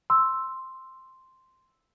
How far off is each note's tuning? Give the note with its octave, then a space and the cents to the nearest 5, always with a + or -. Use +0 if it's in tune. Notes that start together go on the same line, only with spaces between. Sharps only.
C6 +0 E6 +0